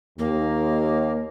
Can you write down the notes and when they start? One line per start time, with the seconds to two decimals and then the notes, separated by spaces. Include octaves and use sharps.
0.19 D#2 A#3